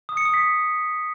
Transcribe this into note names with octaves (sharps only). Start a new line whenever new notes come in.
D#6
C#7
D#6
B6